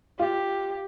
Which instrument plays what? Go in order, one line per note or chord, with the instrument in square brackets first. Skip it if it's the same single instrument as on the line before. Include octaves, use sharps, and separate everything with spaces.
[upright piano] F4 [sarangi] G4